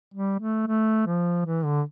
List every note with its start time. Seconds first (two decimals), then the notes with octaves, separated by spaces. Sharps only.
0.14 G3
0.40 A3
0.67 A3
1.06 F3
1.46 E3
1.65 D3